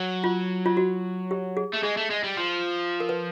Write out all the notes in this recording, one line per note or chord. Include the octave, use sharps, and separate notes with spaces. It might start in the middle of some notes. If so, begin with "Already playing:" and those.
Already playing: F#3
F4
F4
F#4
G4
G#4
A3
G#3 G#4
A3
G#3
G3
F3
A#4
B4